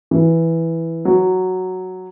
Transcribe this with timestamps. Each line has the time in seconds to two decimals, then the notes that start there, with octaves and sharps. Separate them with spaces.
0.11 E3
1.05 F#3